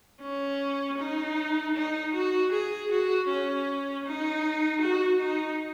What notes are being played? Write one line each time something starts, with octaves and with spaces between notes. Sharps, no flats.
C#4
D#4
D#4
F#4
G#4
F#4
C#4
D#4
F#4
D#4